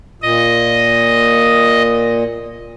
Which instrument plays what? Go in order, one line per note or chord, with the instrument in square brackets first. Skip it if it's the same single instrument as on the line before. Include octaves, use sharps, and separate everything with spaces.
[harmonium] A#2 [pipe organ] D#5